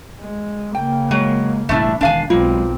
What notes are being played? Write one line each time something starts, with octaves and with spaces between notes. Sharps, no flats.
G#3
C#3 A#3 G5
F#3 G#3
E1 A2 G3 A3 D4 E4
E1 D#3 D4 F5 G#5
B1 F#3 G#3 A#3 C4 F4